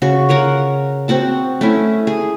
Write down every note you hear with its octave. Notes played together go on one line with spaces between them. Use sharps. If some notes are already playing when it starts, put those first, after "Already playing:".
C#3 F#4
F4 A#4 C#5 F#5
C4 F#4 F#5 A5
A3 C#4 E4
G#4